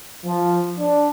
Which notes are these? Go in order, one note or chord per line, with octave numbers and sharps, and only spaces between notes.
F3
D4